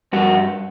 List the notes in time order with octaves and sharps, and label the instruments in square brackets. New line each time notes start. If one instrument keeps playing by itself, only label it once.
[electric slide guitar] G2 F#4